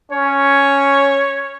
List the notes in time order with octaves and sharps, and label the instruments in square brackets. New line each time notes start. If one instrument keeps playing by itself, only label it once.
[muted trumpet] C#4 [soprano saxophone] C#5